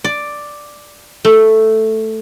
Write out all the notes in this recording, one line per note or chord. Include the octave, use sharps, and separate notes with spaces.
D5
A3